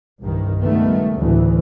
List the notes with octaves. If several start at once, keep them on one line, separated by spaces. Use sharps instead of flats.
C2 G2 D#3
C#2 D#3 G3 A3 B3
D2 A2 E3